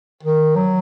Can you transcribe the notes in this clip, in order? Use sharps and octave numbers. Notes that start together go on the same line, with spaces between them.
D#3
F#3